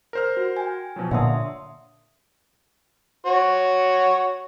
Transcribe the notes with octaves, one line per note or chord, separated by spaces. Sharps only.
A#4 C5 F6
F#4
G5 G#5
B2 F3 F#3
A#2 D3 C#5 E5 C6 D#6
F#4 C#5